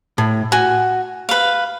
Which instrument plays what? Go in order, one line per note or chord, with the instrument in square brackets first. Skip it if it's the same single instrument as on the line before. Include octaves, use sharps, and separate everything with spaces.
[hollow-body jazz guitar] A2
[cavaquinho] F#4 [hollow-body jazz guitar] G#5
[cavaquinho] B4 F5